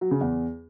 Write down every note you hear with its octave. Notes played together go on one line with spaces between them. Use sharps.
F#3
C#3
E2